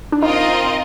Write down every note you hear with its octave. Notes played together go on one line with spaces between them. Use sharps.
D4
C4 D#4 F4 A#4 D#5